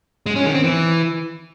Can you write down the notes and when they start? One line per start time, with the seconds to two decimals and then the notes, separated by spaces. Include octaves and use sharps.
0.26 G#3
0.36 C#4
0.45 D#3
0.54 C4
0.64 E3